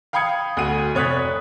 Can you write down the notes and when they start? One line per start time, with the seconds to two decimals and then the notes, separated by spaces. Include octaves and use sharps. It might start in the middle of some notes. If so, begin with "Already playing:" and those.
0.13 F5 G5 B5 D#6 G#6 C#7
0.57 D2 F#4 D#7
0.95 F1 C#5 D#6 F#6 A6 B6